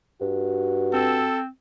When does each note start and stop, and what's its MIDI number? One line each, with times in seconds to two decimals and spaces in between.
0.21 1.25 43
0.21 1.35 66
0.93 1.47 60
0.93 1.40 69